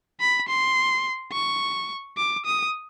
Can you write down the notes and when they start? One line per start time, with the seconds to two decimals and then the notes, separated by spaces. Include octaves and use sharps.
0.20 B5
0.48 C6
1.32 C#6
2.17 D6
2.45 D#6